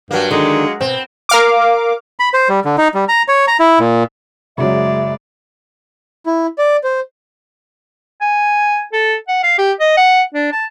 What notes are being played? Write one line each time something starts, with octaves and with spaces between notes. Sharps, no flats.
G2 F#3 A#3
D3 D#3 G#3
B2 C4
A#4 F5 D6
B5
C5
G3
D3
D#4
G3
A#5
C#5
A#5
E4
A#2
F#1 C#3 F#3 G#3 D5 E5
E4
D5
C5
G#5
A4
F#5
F5
G4
D#5
F#5
D4
A5